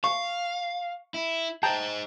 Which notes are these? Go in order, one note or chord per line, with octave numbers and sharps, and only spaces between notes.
F5 C#6
E4
G#4 C5 G5 A5 A#5